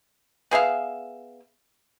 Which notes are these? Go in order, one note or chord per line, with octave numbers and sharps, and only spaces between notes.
B3 G#4 E5 F5